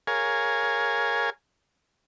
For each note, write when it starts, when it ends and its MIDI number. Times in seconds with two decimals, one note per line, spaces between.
0.07 1.30 68
0.07 1.30 70
0.07 1.30 73
0.07 1.30 77
0.07 1.30 80